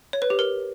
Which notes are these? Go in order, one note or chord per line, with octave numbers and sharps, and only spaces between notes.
C#5
B4
G4
A#4